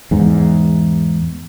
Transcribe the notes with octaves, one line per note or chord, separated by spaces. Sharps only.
E2 G#2